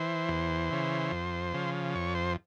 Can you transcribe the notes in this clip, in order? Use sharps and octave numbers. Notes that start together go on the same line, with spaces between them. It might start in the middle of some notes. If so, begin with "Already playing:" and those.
Already playing: E3 C5
E2
C#3 E3
F2
C#3 F3
F2 C#5
C5